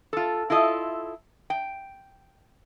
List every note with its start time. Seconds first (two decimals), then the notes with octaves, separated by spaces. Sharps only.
0.13 F4 A4
0.50 E4 F4 A4 D#5
1.50 G5